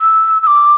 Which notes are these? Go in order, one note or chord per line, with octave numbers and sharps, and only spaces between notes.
E6
E6
D6